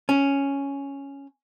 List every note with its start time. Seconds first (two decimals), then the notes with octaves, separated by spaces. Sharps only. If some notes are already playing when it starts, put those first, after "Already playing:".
0.09 C#4